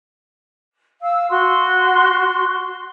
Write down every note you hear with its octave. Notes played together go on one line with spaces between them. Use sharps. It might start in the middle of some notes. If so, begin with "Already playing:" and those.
F5 E6
F#4 C6